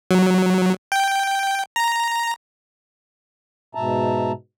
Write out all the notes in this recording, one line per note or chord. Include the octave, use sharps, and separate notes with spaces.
F#3
G5
A#5
G#2 B2 E5 A5 A#5